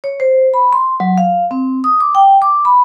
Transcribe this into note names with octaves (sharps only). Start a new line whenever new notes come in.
C#5
C5
B5
C6
F#3
F5
C4
D#6
D6
G5
D6
B5